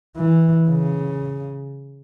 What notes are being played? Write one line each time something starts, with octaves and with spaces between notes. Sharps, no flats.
E3
C#3